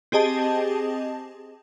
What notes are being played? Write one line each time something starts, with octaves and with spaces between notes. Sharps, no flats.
C4 G4 G#4 D#5 A5